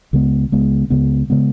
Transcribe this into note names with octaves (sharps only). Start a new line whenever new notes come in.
C#2 C#3 G#3 B3
C#2 C#3 G#3 B3
C#2 C#3 G#3 B3
C#3 G#3 B3